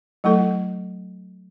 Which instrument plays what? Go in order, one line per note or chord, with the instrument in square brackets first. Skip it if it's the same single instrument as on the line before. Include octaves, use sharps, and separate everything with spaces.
[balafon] F#3 A3 E4 A4